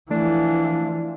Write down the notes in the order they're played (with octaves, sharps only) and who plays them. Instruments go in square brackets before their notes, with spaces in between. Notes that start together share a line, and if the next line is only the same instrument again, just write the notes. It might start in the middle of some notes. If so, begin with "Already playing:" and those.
[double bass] E3 F3 [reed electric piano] A3 [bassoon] D4